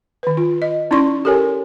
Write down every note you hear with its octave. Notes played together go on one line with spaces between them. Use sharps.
D#3 B4
F4
D#5
C#4 D#4 E4 D5 C6 C#6
G4 A4 A#4 C#5 G#5